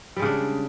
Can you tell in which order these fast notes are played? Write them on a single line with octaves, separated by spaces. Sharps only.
G3 G#3 C#3 D4